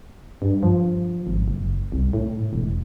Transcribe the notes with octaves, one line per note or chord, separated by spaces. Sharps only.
G2
F3
G#1
F#1
C2
A2
E1